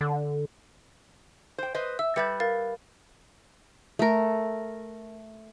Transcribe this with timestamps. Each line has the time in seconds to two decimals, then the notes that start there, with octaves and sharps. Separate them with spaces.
0.01 D3
1.58 C5 G5
1.75 B4 C5 D#5
1.99 E5 E6
2.16 G3 B4 E5 G6 A6 C#7
2.40 A#4 F5 A6
3.99 A3 A#4